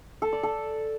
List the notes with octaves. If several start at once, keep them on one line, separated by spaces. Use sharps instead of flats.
A4
D5
A4